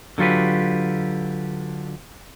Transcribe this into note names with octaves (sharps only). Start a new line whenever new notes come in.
D3 F#3 F4 G4 B4